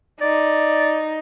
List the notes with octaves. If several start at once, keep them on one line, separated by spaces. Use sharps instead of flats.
D#4 D5